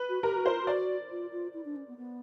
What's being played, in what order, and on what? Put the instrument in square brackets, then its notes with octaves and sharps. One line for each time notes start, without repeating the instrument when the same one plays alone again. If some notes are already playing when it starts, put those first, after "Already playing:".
Already playing: [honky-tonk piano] B4
[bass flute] F#4
[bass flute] G4 [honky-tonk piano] A#4
[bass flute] F#4
[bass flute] F4 [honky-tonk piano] C5
[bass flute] F#4 [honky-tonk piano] D5
[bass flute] F4
F4
E4
D4
C#4
B3
B3